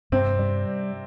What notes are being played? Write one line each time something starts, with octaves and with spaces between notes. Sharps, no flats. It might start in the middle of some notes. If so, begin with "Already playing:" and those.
G2 C3 C4
G3